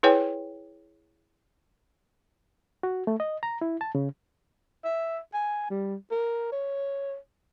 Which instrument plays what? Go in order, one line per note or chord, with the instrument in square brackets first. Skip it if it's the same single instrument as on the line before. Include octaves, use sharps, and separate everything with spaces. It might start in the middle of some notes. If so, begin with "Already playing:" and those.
[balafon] E4 G#4 B4 C#5 G5 G#5
[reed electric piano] F#4
A3
D#5
A#5
E4
A5
C#3
[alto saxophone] E5
G#5
G3
A#4
C#5